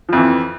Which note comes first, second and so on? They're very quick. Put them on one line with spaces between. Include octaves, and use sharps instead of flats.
F3 F2 E3